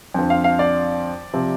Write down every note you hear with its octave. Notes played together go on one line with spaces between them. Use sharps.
F2 D3 F3
F5
F5
D5
C3 F3